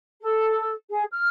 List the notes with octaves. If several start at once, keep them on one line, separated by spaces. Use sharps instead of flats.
A4
G#4
F6